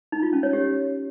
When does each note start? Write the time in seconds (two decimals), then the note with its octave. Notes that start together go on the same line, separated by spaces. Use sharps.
0.12 D#4
0.23 F4
0.33 C#4
0.43 C#5
0.53 G4